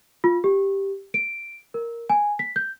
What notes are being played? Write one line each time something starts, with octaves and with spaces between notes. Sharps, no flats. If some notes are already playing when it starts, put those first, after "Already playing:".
F4
G4
D7
A#4
G#5
B6
G6